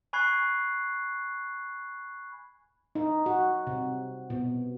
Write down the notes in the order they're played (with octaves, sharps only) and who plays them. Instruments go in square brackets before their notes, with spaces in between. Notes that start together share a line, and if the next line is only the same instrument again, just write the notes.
[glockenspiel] G#5 B5 C#6 F#6 G#6 C7
[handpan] D#4
F#4
C3
B2